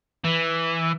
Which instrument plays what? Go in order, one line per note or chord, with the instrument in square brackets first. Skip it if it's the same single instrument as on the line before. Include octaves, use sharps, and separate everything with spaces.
[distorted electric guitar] E3